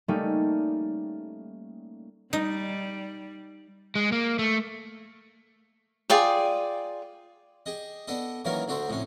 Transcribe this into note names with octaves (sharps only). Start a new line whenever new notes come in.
G3 A3 A#3 C#4 D#4
G3 D#4
G#3
A#3
A3
F4 G#4 D5 G5
G4 G#4 D#5
B3 D4 A4 D#5
D#3 E3 F#3 A#3 C#4 A#4
D2 D4 F#4 A4 C5
A2 C3 C#4